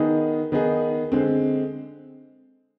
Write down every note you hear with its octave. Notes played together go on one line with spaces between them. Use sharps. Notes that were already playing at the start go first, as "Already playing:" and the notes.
Already playing: D#3 B3 D#4 G#4
D#3 B3 D#4 G#4
D3 G#3 C4